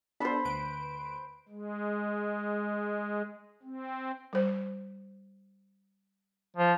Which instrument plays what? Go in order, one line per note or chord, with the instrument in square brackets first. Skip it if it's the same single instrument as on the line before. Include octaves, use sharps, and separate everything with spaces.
[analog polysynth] B3 D4 A4 [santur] C5 B5
[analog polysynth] D2 B4 D7
[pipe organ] G#3
C4
[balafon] G3 C5
[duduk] F3